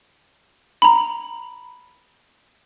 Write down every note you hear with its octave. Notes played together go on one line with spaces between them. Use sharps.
A#5 B5